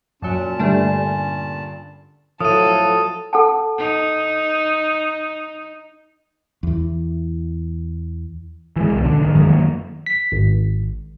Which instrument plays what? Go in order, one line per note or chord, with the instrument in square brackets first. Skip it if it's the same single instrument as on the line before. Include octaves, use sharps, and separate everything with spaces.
[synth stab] F#2 F#3 [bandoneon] A#2 A5 [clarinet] C#4
[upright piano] G2 D3 B4 [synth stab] G3 A3 D4
[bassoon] A2 [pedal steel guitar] F3 F#3 [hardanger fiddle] A4 [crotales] D#6 D#7
[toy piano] A4 F#5 A5
[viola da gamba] D#4
[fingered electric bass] E2 E3
[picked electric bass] E3 F#3 G#3
C2 B2
D3 D4
A1 D#3
F#2 D#3 F3 G#3
F#2 D#3 F#3 A#3
[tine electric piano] B6
G#1